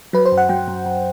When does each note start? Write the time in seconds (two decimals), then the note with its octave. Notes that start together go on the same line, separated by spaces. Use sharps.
0.13 F#3 B4
0.25 C5
0.32 F#2
0.38 F#5
0.49 F#3 G5
0.68 F#2
0.86 F#2